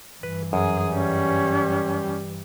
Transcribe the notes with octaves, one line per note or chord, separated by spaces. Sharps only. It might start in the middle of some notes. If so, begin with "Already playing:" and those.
G2 E3 B4
F#2 G#4
G3 C#4